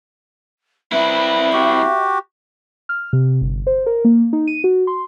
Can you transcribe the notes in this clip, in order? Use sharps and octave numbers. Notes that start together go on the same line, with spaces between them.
C4 E4 B4 E5
F#4 G4
F6
C3
G1
C5
A#4
A#3
D#4
D#7
F#4
C6